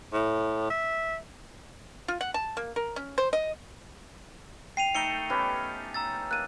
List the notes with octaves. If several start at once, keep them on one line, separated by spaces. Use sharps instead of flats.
A2
E5
F4
F#5
A5
A#3
A#4
C#4
C5
D#5
G5 C7 D#7 F7
A3 D#4 A4 C#7 D#7 G7
B3 C#4 G4
A#5 E6 A6
A#3 F#6 D#7